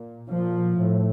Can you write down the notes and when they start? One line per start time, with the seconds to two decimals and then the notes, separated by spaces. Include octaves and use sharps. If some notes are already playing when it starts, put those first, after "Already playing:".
Already playing: A#2
0.30 A#2 F3
0.77 A2